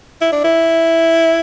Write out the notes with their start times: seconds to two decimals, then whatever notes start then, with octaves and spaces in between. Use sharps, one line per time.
0.21 E4
0.32 D4
0.44 E4